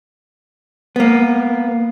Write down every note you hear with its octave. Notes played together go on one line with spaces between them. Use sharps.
A#3 B3